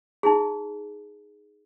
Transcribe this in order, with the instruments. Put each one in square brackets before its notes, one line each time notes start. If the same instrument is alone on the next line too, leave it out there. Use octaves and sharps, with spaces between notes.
[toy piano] D#4 E4 G#4